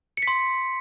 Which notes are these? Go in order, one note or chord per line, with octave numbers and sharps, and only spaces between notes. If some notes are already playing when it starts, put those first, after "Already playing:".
C#7
B6
C6